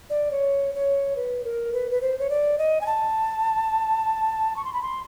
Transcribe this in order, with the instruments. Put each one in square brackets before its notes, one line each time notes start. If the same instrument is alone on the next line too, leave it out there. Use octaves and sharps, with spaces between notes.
[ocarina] D5
C#5
C#5
B4
A#4
B4
B4
C5
C#5
D5
D#5
G#5
A5
C#6
C6
B5
C6